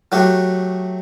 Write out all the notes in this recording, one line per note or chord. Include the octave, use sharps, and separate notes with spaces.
F#3 A3 F#4 G4